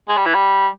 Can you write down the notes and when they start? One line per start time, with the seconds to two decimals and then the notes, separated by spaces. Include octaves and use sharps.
0.09 G#3
0.17 G3
0.26 E3
0.34 G3